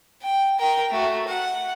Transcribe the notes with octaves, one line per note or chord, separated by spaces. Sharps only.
G5
A#4 G5
A3 F#4
F#5